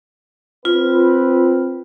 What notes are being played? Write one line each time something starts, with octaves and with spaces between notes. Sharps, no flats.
C4 F4 B4